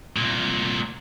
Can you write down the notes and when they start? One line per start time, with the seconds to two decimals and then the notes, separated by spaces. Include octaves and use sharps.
0.17 C2 A#2